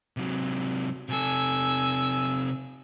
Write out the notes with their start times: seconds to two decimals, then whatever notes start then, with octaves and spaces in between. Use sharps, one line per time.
0.17 C3 F#3
1.09 C3 A4 G#5 E6